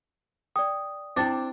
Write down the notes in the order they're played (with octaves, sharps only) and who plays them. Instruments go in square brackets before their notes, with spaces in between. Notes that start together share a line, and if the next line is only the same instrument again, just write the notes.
[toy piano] D5 G5 [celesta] D#6
[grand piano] C4 [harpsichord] D4 A5 [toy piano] E4 G5 D6